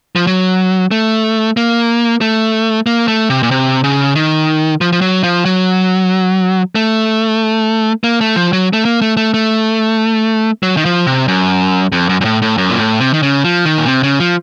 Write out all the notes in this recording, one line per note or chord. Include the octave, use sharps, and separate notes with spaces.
F3
F#3
A3
A#3
A3
A#3
A3
C3
A#2
C3
C#3
D#3
F3
F3
F#3
F3
F#3
A3
A#3
A3
F3
F#3
A3
A#3
A3
A3
A3
F#3
D#3
F3
C3
F#2
F2
F#2
F#2
A2
A2
F#2
A#2
A2
C3
D#3
C#3
F3
D#3
A#2
C3
C#3
F3